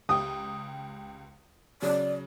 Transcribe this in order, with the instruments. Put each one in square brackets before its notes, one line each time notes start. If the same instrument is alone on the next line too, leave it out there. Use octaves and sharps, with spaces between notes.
[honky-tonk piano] C#2 G4 G5 [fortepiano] D#6
[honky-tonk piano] C#3 F#3 [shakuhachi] D5